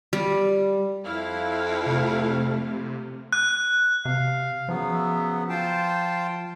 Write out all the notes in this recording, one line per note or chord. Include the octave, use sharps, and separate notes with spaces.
G3
F2 E4 F5
C3 A3
F#6
C3 F5
C#3 F3 F#3 B3
E5
F4 C5 G5 A5